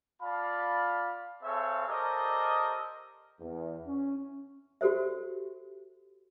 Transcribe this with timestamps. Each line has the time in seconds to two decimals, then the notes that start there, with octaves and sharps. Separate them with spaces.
0.22 F4 D5 F5 A5 B5
1.44 C4 G#4 A4 C#5 E5 F5
1.88 G4 A4 A#4 C5 D5 D#5
3.40 E2
3.86 C#4
4.81 F#4 G4 A4 C5 E5